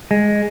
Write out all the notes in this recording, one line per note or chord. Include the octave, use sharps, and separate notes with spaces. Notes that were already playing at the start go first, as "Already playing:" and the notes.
G#3